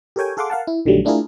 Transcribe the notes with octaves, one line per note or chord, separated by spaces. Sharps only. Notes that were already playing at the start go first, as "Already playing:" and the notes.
G4 A4 A#4 C#5 G5 G#5
G#4 A4 F5 F#5 C6 D6
A#4 F5 F#5 A5
E4
A#1 D3 D#3 F#3 G3 A3
A3 D4 E4 F4 G#4 A#4